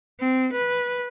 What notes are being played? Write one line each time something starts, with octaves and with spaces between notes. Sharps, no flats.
C4
B4